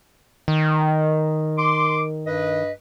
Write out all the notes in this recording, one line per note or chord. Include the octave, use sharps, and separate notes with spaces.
D#3
C6 D6
G2 B4 D#5